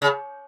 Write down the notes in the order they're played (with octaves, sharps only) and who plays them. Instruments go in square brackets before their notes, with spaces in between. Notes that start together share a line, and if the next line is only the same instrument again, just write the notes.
[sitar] C#3